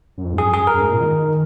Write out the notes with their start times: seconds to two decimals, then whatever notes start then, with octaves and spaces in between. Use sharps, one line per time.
0.18 F#2
0.24 F2
0.33 G#2
0.38 F#2 G#4
0.53 G#4
0.67 A#4
0.74 F#2
0.81 G#2
0.91 A#2
1.01 D#3